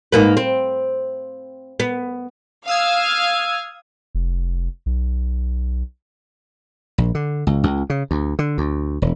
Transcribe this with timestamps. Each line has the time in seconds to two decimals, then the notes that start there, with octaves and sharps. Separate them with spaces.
0.12 G#2 A#3 B4
0.37 C4
1.80 B3
2.67 F5 D#6 E6 G#6
4.15 F1
4.86 B1
6.98 A#1
7.15 D3
7.47 C#2
7.64 C#2
7.90 C#3
8.11 D2
8.39 D3
8.58 D2
9.02 E1